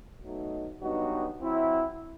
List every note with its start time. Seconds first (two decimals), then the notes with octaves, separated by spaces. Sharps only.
0.21 B2 F#3 A3 D#4
0.80 G2 F#3 B3 D#4 F#4
1.39 F#3 C4 E4